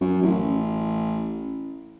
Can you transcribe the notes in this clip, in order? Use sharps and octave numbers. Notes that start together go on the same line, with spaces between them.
F#2
A1